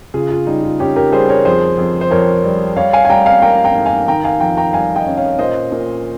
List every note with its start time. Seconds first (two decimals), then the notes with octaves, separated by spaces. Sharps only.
0.14 C#3 F4 G#4
0.30 F4
0.47 G3 D#4
0.63 F4
0.80 C#4 D#4 G4
0.96 G4 A#4
1.12 G3 G#4 C5
1.29 A#4 C#5
1.45 F2 G#4 C5
1.78 F2
2.01 C5
2.11 F2 A#4 C#5
2.44 G3
2.76 G3 C#5 F5
2.93 F5 G#5
3.05 G#5
3.09 G3 G5 A#5
3.26 F5 G#5
3.42 A#3 G5 A#5
3.64 G5 A#5
3.75 G#2
3.86 F5 G#5
4.08 D#3 G5 A#5
4.24 F5 G#5
4.40 F2 G5 A#5
4.57 G5 A#5
4.73 G3 F5 G#5
4.96 D#5 G5
5.06 C#4
5.17 C#5 F5
5.39 A#2 C5 D#5
5.72 A#2